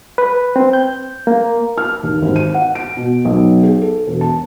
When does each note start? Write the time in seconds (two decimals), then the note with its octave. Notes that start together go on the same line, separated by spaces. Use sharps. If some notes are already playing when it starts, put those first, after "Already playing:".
0.18 B4
0.56 C4
0.73 G6
1.27 A#3
1.78 F6
2.03 D#2
2.22 G#1
2.36 D#7
2.54 F#5
2.75 D7
2.97 B2
3.25 B1
3.63 G#4
3.82 A4
4.07 E1
4.21 A5